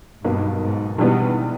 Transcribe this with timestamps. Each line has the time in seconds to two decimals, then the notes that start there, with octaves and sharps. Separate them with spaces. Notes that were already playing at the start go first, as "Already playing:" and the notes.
0.25 B1 G2 B2 A#3
0.62 G#2
0.98 A#1 G#2 B2 E3 G3 B3